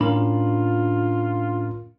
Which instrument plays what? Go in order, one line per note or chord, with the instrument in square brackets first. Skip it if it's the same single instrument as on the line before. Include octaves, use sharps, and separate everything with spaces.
[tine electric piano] A2 C#4 A#4 [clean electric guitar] D4 B5 [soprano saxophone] F4